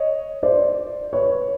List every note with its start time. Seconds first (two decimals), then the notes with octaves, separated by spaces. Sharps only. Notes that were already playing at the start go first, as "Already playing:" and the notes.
Already playing: C#5 D#5
0.43 C5 D5
1.13 B4 C#5